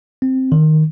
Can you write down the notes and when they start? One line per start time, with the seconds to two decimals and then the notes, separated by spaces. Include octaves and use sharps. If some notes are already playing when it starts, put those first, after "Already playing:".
0.22 C4
0.52 D#3